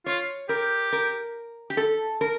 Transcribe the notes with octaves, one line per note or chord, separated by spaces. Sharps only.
F4 C#5
G4 A#4
A#4
G4
A4
A#4